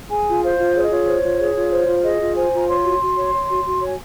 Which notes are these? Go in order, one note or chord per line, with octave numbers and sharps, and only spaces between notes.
G#4 G#5
F4
C5 F5
F4
G#4 C#5
D#5
F4 C#5
C5
F4
G#4
F4
C5
F4
G#4 D#5
F4
C5 G#5
F4 A#5
C#5 C6
F#4
F#4
C#5
C#5
F#4
F#4
C#5
G#5